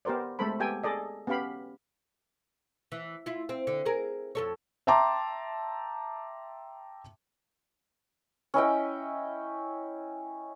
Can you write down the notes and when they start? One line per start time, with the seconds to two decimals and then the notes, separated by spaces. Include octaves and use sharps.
0.05 B3 G4 A#4 C5 D5
0.39 G#3 A3 C4 A4 C5 B5
0.59 B3 G4 A4 G5 G#5
0.83 G#4 A4 D5 D#5
1.27 B3 C#4 G4 F5 B5
2.92 E3
3.26 E4 F4
3.49 C4
3.67 D3
3.86 G#4 A#4
4.35 F2 A4 C#5
4.87 E5 G5 A5 A#5 C6 D6
8.54 C#4 E4 D#5 G5